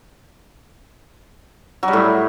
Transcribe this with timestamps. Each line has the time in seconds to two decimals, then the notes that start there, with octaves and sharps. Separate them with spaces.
1.83 F#3
1.88 G3
1.93 A2